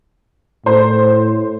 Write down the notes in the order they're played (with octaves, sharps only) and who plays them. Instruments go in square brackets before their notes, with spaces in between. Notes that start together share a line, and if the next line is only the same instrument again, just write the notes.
[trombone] A2 [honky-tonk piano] C5